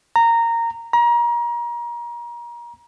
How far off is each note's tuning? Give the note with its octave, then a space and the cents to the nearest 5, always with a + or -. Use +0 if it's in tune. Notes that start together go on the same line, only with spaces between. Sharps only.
A#5 -15
A#5 +30